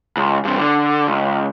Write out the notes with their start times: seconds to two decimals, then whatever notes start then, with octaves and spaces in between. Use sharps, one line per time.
0.17 C#2
0.45 G2 C3
0.58 D3
1.07 C#2